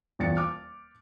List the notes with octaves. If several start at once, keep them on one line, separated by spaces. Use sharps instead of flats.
D#1 E2 A6 C#7
D6 F6